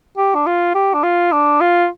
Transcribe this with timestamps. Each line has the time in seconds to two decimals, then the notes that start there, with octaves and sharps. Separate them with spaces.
0.18 G4
0.35 D4
0.47 F4
0.75 G4
0.94 D4
1.04 F4
1.32 D4
1.61 F4